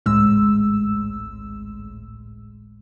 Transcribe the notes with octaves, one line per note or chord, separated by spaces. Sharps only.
G#1 C#2 A2 G#3 E6